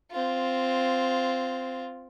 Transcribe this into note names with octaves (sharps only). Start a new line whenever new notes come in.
C4 F4